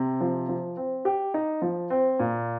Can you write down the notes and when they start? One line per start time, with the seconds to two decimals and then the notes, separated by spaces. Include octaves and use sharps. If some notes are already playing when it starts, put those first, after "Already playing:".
Already playing: C3 C4
0.21 F3
0.49 F3
0.77 C4
1.05 G4
1.34 D#4
1.62 F3
1.90 C4
2.19 A#2